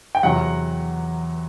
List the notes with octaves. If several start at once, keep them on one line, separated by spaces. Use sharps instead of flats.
G5
E2 C3 F#3 F#5